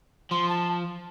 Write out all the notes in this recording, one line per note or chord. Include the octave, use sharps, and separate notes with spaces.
F3 C6
A5